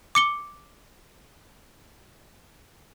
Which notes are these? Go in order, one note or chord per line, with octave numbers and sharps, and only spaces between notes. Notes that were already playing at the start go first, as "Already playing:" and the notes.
D6 C#7 G7